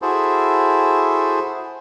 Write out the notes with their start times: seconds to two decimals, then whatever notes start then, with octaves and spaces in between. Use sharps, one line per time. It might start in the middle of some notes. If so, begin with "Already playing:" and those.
0.02 E4 F#4 G#4 A4 C5